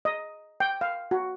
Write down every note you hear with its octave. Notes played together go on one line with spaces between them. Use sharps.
D#5
G5
F5
F#4